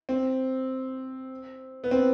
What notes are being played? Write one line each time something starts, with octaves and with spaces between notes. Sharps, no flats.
C4
B3
C4